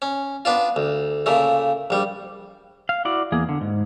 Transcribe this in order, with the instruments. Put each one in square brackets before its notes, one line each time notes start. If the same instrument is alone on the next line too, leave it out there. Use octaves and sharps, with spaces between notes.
[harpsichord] C#4
B3 D4 F4
D2
A#2 C#3 A3
A#1 G3
[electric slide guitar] F5
E4 F#4 D5
E2 A#3 G#4
D3
G#2